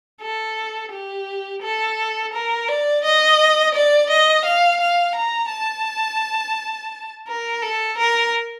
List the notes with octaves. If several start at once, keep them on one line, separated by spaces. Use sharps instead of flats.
A4
G4
A4
A#4
D5
D#5
D5
D#5
F5
F5
A#5
A5
A#4
A4
A#4